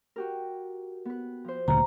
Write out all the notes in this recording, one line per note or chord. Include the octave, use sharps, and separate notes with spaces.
F#4 G4 A#4
B3 B4
F3 C5
D2 A#2 C#3 A#5